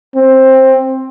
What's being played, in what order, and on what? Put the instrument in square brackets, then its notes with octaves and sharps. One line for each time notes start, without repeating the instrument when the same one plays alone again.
[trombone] C4